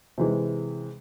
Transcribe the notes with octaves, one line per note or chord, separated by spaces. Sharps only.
C3 E3 G#3